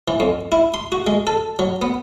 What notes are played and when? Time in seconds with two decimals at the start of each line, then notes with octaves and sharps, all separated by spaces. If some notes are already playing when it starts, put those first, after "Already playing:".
0.08 E3
0.20 F2
0.52 E4
0.74 C6
0.92 F#4
1.07 G#3
1.27 A4
1.59 F#3
1.82 B3